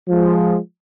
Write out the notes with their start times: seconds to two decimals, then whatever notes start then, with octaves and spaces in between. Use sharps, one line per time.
0.09 F3 G#3